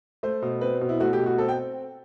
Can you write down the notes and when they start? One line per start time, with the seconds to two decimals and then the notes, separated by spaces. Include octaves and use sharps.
0.23 A3 C5
0.42 B2
0.61 C4 B4
0.81 B2
0.89 E4
1.00 A3 F#4
1.13 G4
1.19 B2
1.26 F#4
1.38 C4 A4
1.48 G5